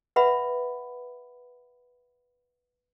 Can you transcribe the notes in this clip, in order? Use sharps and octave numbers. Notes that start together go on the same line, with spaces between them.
B4 E5 F#5 B5